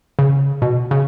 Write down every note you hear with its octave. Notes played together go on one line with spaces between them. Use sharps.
C#3
B2
C#3